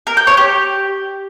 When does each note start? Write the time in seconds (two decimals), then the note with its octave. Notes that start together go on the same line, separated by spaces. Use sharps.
0.07 A#4
0.17 G5
0.27 C#5
0.37 G4